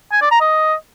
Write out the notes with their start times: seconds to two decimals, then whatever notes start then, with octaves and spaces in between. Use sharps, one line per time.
0.12 G#5
0.22 D5
0.31 A#5
0.41 D#5